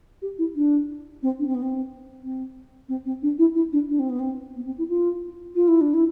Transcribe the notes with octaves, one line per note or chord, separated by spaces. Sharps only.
G4
E4
D4
C4
D4
C4
B3
C4
C4
C4
C4
D4
E4
E4
D4
D4
C4
B3
C4
B3
C4
E4
F4
F4
E4
D4
E4